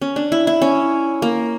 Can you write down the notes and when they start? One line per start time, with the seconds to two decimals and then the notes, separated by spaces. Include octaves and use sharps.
0.02 C#4
0.16 D4
0.32 E4
0.47 E4
0.62 C#4
1.22 A#3